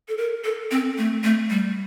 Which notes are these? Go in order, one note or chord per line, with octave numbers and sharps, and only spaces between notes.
A4
A#4
A4
C4
A3
A3
G3